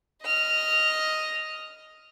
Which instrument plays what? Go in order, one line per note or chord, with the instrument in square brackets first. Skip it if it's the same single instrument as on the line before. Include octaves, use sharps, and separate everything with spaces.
[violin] D#5 F6